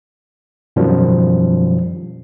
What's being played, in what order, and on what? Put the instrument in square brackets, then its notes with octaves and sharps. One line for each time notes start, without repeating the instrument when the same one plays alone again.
[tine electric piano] F#2 B2 D#3 F3 G3